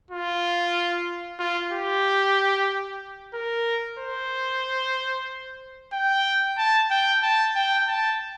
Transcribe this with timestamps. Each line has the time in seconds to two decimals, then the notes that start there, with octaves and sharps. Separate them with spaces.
0.11 F4
1.40 F4
1.72 G4
3.34 A#4
3.99 C5
5.93 G5
6.58 A5
6.91 G5
7.23 A5
7.55 G5
7.88 A5